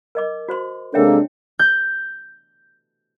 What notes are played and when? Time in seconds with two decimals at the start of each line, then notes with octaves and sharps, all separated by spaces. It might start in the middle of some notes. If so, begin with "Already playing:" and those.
0.15 A#4 D#5 D6
0.49 F#4 C5 C6
0.94 C3 G#3 A#3 D4 A4 C#5 E5 G5
1.59 G6